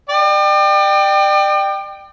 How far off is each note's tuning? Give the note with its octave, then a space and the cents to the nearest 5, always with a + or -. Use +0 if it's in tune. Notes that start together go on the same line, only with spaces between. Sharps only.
D5 +40 G5 +0